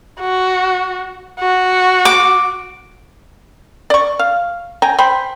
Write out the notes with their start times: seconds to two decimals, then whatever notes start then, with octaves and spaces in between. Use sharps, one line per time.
0.20 F#4
1.40 F#4
2.05 D6
3.90 D5 C#6
4.19 F5
4.82 G5 G#5 A#5
4.99 C5 G5 B5